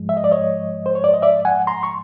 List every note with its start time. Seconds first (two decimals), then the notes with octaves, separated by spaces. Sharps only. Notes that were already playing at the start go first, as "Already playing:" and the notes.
Already playing: G#2 F3 G#3
0.09 E5
0.17 D#5
0.24 D5
0.32 C#5 D#5
0.86 C5
0.95 C#5
1.04 D5
1.14 D#5
1.22 D5 E5
1.45 F#5 G#5
1.67 A#5 C6
1.83 C#6